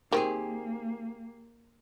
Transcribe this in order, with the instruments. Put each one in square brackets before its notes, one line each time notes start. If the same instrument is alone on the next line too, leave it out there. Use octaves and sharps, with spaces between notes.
[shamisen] D#3 C4 [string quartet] A#3 [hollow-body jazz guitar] G4 G#4